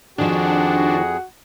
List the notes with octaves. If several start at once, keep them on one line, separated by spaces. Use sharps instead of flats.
F2 D#3 F3 D4 F#4 G#4